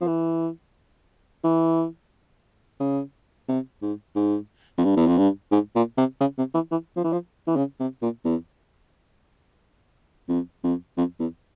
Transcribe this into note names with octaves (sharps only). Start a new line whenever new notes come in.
F3
E3
E3
C#3
C3
G#2
G#2
F2
G2
E2
F2
G2
G#2
A#2
C3
C#3
C3
E3
E3
F3
E3
F3
E3
C#3
C3
A#2
E2
F2
F2
F2
E2